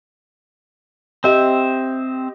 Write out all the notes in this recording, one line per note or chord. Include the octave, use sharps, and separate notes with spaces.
C4 G4 D#5 E5